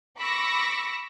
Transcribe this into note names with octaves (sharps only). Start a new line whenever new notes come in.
B5 C#6 D6 E6 A#6